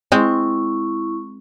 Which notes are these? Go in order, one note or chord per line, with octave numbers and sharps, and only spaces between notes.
G#3 C4 E4 C#6